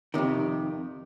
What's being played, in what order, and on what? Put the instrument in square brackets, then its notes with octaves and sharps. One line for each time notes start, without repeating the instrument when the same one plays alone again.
[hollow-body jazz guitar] F2 C3 D#3